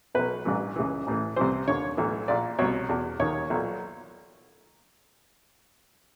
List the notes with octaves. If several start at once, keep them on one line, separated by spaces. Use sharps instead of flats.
B1 B2 B4
A1 G2 E3
C#2 C#3 E3
A1 A2 E3
C2 C3 E3 C5
D#2 D3 C#5
B1 A2 E3
A#1 A#2 D5
C2 B2 C#5
E2 B2
D#2 D#3 C#5
B1 A#2